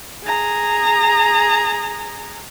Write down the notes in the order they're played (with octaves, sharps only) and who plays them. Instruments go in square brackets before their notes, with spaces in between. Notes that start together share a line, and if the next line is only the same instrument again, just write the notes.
[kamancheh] G#4 A#5